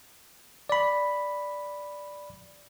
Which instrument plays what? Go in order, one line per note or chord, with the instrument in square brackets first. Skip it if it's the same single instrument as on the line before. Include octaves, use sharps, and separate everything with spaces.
[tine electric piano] D5 B5